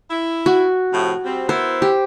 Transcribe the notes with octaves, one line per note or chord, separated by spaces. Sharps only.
E4
F#4
A2 C3 F3
G3 C4
B3 E4 A#4 C5
G4